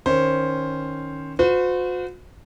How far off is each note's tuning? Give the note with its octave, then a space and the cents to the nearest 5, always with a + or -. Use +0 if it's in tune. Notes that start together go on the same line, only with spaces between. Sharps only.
D#3 -5 C#4 +0 C5 +0
F#4 -40 C5 -45